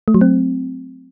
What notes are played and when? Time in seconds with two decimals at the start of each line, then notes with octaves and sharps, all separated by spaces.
0.08 A3
0.14 F#3
0.21 C4